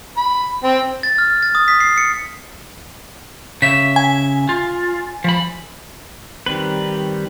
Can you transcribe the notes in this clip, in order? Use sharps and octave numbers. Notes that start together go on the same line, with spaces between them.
B5
C4
A6
F6
A6
D#6
B6
C7
C#7
C#3 E5 B6
G#5
F4
F3 B5
D#3 G3 C4 B4